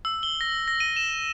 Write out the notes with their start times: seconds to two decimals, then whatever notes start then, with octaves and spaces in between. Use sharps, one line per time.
0.05 E6
0.23 G7
0.41 A#6
0.68 A#6
0.80 D#7
0.96 E7